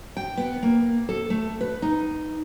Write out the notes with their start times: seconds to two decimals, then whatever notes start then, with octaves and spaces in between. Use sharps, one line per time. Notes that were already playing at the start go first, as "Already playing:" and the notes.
0.17 G5
0.37 B3
0.63 A#3
1.09 A4
1.30 A3
1.61 B4
1.82 D#4